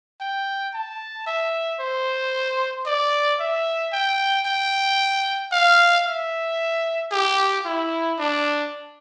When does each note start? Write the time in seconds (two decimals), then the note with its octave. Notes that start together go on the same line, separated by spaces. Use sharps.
0.21 G5
0.74 A5
1.27 E5
1.80 C5
2.86 D5
3.40 E5
3.93 G5
4.46 G5
5.52 F5
6.05 E5
7.12 G4
7.65 E4
8.19 D4